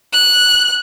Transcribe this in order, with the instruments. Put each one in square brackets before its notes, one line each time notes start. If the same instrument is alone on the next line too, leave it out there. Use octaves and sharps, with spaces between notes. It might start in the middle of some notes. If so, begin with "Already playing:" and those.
[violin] F#6